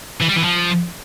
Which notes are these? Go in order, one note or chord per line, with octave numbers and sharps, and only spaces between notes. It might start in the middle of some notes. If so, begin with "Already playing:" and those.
E3
G3
E3
F3